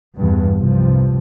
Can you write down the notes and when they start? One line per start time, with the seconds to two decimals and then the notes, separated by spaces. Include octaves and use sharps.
0.17 E2 G2
0.57 C2 G2 C3 F3